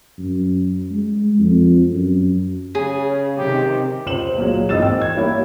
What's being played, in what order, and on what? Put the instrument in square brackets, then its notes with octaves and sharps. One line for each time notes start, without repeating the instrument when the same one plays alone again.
[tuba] F#2
G#3
F2
F#2
[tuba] C#3 [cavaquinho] G#4
[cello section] C3 D#3 [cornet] G4
[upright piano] C#2 C5 E7 F#7
A#2 F#3 G#3
G#1 E3 D#5 E6 A6 E7
G5 E6
G#6
G3 A#3 E4 C#5